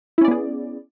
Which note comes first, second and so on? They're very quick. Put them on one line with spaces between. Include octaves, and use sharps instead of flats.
E4 C#4 D5 B3 G#4